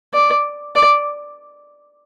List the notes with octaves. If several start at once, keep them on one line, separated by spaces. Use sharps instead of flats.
D5
D5